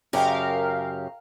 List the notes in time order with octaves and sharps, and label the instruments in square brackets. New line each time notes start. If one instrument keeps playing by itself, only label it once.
[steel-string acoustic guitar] F#2 C#3 G4 [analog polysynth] A#4 F5 [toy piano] D5 G5 A5